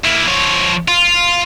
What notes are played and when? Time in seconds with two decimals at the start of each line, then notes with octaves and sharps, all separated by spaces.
0.05 A#3 E4
0.28 F3 C#5
0.88 F4